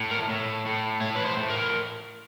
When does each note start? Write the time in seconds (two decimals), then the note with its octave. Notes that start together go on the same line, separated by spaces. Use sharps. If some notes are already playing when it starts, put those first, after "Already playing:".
Already playing: A2
0.11 A#4
0.30 A2
0.66 A2
1.01 A2 C#5
1.16 B4
1.26 C5
1.37 A2
1.50 A#4